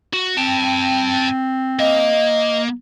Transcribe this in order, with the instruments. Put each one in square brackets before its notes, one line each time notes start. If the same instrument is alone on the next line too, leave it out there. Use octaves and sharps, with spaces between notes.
[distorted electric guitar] F#4
[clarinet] C4 [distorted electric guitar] G5 A5
[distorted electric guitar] A#3 [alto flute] D#5